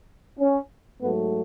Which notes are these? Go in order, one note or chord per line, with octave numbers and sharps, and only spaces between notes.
C#4
G#2 F#3 A3 B3